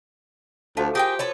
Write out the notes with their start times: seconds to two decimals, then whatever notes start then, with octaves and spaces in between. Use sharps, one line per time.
0.77 D2 F3 A3 F#4 D6
0.95 G4 G#4 A#4 G5
1.19 A4 B4 C#5